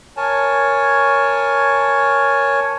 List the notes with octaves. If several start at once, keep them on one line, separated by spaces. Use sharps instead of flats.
A#4 C#5 G#5 A5